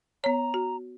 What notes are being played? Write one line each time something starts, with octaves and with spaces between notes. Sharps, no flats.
B3 C#5 A#5
F#4